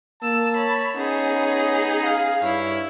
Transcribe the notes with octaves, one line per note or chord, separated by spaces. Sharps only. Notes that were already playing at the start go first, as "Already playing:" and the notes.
A#3 A5 E6
C#5 B5
B3 C#4 D#4 G#4
F5
G2 E4 C#5